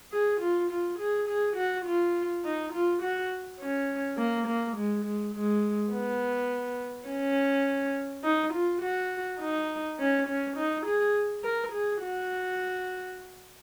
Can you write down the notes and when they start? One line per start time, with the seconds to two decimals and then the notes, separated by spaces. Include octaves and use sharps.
0.12 G#4
0.41 F4
0.70 F4
0.99 G#4
1.28 G#4
1.56 F#4
1.86 F4
2.44 D#4
2.73 F4
3.02 F#4
3.60 C#4
4.18 A#3
4.47 A#3
4.77 G#3
5.05 G#3
5.34 G#3
5.93 B3
7.08 C#4
8.24 D#4
8.53 F4
8.82 F#4
9.40 D#4
9.99 C#4
10.27 C#4
10.57 D#4
10.86 G#4
11.44 A#4
11.72 G#4
12.02 F#4